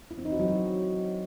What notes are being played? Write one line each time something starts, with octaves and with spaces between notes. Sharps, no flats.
E4
C4
D#4
F#4
F#3